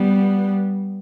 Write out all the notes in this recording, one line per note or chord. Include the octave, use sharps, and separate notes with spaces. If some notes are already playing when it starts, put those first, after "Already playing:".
Already playing: G3 B3